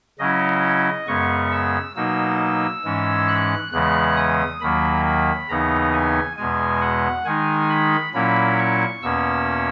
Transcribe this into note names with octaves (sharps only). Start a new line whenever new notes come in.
C#3 F#3 C#4 E4 D#5
F#2 C#3 G#3 B3 C#6
E6
B2 F#3 A#3 D#4 E6
G#2 E3 G#3 C#4
F#6
E2 C#3 E3 G#3 F#6
D#6
D#2 D#3 F#3 A#3 B5
B5
D#2 C#3 E3 B3 D#4 A#5
G#5
E2 B2 G#3 G#5
F#5
D#3 G#3 D#4 G#5
B5
A#2 F#3 A#3 C#4 E4 B5
C#6
E2 B2 A#3 C#4 E6